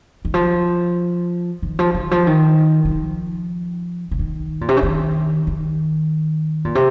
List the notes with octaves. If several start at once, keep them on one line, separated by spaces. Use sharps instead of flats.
D#3
F3
D#3
F3
D#3
F3
D#3
D#3
F3
C#3
D#3
A#2
C3
C#3
D#3
D#3
A#2
C3